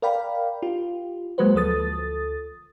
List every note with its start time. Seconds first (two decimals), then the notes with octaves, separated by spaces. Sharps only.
0.02 A#4 D5 F5 G5 B5
0.63 F4 G4
1.38 F#3 G#3 A#3 F#4 B4 C5
1.54 D2 F3 A4 D#6 A6